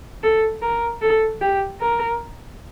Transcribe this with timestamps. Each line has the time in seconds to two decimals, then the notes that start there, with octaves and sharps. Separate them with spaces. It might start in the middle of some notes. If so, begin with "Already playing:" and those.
0.23 A4
0.62 A#4
1.02 A4
1.41 G4
1.80 A#4